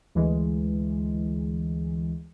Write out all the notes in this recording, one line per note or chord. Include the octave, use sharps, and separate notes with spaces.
D2 E3 G#3